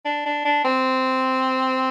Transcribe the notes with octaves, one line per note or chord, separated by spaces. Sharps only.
D4
D4
D4
C4